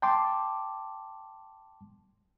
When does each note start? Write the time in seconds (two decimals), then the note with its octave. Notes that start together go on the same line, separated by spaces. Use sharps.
0.02 G5 A5 C6 D6